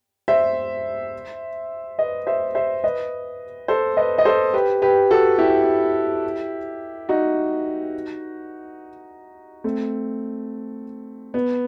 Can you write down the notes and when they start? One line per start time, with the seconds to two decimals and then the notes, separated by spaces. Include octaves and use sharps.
0.28 C5 E5
1.98 B4 D#5
2.27 C5 E5
2.55 C5 E5
2.84 B4 D#5
3.68 A4 C5
3.97 B4 D#5
4.18 D#5
4.25 A4 C5
4.53 G4 B4
4.82 G4 B4
5.11 F#4 A4
5.38 E4 G4
7.09 D#4 F#4
9.64 A3 C4
11.34 B3